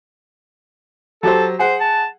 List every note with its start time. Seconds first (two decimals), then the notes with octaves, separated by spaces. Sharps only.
1.23 F#3 G4 A4 C5
1.59 G#4 C5 F#5
1.80 A5